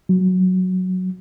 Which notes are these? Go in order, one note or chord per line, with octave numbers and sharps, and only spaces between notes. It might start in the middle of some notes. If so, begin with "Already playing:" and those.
F#3